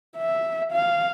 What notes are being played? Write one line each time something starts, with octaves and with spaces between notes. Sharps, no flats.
E5
F5